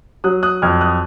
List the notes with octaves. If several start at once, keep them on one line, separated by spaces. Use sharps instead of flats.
F#3 D#6 F#6
D#6 F#6
F2 F6 G#6
D#6 F#6